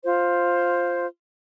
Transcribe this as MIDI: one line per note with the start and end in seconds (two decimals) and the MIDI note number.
0.03 1.05 65
0.03 1.05 72